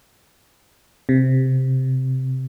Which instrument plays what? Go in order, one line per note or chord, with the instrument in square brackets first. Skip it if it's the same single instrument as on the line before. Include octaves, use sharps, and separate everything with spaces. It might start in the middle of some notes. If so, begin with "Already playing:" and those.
[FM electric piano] C3